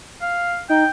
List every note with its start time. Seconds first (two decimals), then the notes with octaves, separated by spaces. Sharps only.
0.22 F5
0.69 D#4 G5